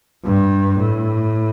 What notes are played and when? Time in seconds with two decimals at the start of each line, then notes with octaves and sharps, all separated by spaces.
0.25 G2
0.80 A2